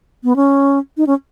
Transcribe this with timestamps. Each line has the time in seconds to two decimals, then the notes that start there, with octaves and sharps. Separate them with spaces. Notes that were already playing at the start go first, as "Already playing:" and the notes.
0.24 B3
0.36 C#4
0.97 D#4
1.07 C#4